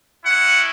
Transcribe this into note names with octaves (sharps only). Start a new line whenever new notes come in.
G#3 C#4 E4 F#5